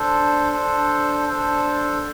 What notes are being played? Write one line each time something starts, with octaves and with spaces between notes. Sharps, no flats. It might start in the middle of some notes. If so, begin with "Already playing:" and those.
Already playing: D4 A4 C5
D4 A4 C5
D4 A4 C5